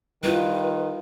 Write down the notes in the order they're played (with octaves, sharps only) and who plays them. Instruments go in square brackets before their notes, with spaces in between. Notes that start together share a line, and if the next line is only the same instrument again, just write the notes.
[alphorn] D#3 [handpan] G3 E4 F4 [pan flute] B4